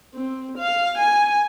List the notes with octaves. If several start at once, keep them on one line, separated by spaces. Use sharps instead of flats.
C4
F5
G#5